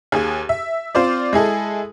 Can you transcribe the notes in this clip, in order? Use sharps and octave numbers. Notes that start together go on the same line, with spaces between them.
D#2 G#4
E5
C4 F4 C5 D5
G#3 E4 G#4 A4